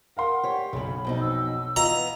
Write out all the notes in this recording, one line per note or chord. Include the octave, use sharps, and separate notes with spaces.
A#4 F5 F#5 C6
G4 C#5
B1 F#2 C#3 B5
F2 B2 D#4
E6
E3 B3 F4 D#5 A#5